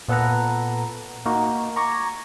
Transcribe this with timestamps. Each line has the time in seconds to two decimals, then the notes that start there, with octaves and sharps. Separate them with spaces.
0.08 A#2 B3 A4 B4 F#5 A#5
1.26 A#3 D#4 F#4
1.76 A#5 C#6 D6 G#6 A#6